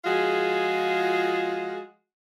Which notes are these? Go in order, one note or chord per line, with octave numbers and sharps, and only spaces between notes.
F3 G#3 F4 F#4 G#4